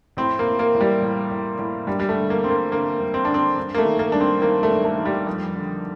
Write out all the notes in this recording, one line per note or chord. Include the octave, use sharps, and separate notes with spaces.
A2 C4
A#3
A2
A#3
A2
G3
A2
A2
A2
G2 G3
G3
A3
D3
A#3
G2 C4
A#3
D3 A#3
G2
C4
D3 D4
C4
G2
A#3
A3
D#3
A#3
G2 D4
C4
D#3 A#3
A3
G2
A3
D#3
G3
F2
D3